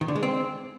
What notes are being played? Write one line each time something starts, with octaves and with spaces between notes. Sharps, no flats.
D#3
D3
G#3
C4